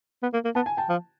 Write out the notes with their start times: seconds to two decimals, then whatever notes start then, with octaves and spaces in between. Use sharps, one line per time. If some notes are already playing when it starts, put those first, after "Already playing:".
0.23 B3
0.34 A#3
0.45 A#3
0.55 B3 A5
0.66 G#5
0.77 G5 A5
0.89 F3